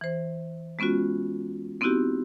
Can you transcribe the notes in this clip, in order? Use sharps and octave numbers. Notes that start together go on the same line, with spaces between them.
E3 C5
G#3 B3 C#4 F4 F#4
B3 C4 D#4 E4 F#4 G4